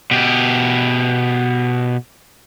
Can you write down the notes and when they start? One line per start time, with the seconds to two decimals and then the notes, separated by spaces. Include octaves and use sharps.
0.11 B2 G4